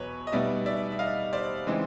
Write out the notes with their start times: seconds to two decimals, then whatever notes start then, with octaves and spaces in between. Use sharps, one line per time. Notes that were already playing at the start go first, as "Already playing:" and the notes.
Already playing: E2 B2 F#3 B4 C#5
0.27 D#5
0.32 B2 G3 B3 D#4 D5 E5
0.66 D5 E5
0.92 E5
0.99 D#5 F5
1.33 C5 D5
1.67 C#3 E3 G#3 C4 D#4